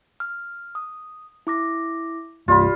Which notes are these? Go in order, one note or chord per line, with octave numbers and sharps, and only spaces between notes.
F6
D#6
E4 D6 A#6
C2 G2 F4 G4 D5 B5